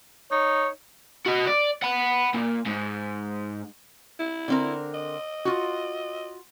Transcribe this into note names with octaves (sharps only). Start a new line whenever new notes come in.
D#4 C#5
F#4 D#5
D5
F#5 B5
A#2
G#2
E4
D3 C4 A#4
D#5
F4 F#4